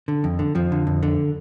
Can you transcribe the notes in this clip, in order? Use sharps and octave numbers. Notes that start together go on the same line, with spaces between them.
D3
F2
D3
F2 F3
D3
F2
D3